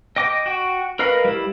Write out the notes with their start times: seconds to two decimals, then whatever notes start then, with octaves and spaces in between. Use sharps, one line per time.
0.16 D#5 G5 D6
0.46 F#4 G5
0.99 A#4 B4 D#5 F5
1.25 G3 E4